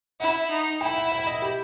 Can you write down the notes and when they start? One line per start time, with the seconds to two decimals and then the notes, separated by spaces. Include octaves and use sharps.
0.20 E4 F#5
0.50 D#4
0.81 E4 G5
0.97 F#5
1.12 E5
1.27 D#5
1.42 G4